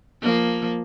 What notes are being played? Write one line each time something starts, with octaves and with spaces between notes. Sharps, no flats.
F3 A#3